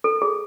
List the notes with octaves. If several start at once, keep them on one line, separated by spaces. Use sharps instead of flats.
A4
G#4